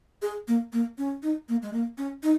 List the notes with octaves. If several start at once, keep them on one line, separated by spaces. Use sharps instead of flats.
G#4
A#3
A#3
C#4
D#4
A#3
G#3
A#3
C#4
D#4